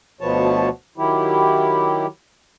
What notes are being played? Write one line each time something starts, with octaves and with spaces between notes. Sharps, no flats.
D2 B2 F3 B3 C#5 A5
D#3 F#3 E4 G4